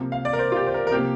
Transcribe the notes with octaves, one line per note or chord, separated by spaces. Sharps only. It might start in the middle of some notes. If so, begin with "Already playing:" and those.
Already playing: C3 F3 A#3
F5
D5
A#4
C5
F4
G4
C5
A#4
A#4
C3 F3 A#3 G4